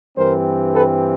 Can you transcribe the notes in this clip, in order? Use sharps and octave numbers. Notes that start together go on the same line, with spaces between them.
G2 E3 G3 C4 A#4 C5
A4 B4